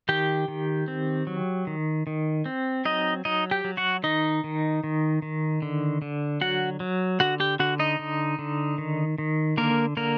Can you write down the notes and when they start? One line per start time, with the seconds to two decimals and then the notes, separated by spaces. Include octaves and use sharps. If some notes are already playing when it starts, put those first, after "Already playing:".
0.09 D#3 G4 G5
0.48 D#3
0.88 C4
1.27 F#3
1.67 D#3
2.07 D#3
2.46 C4
2.85 F#3 D#4 D#5
3.25 F#3 D#4 D#5
3.51 G4 G5
3.64 F#3
3.77 F#4 F#5
4.03 D#3 D#4 D#5
4.44 D#3
4.84 D#3
5.22 D#3
5.62 D3
6.02 D3
6.41 F#3 F#4 F#5
6.80 F#3
7.20 D3 F#4 F#5
7.40 G4 G5
7.59 D3 F#4 F#5
7.79 D#4 D#5
7.99 D3
8.39 D3
8.78 D#3
9.18 D#3
9.57 D3 A#3 A#4
9.97 D3 A#3 A#4